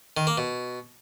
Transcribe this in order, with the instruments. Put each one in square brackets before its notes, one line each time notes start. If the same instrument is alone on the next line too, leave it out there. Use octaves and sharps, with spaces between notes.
[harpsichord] D#3
A#3
B2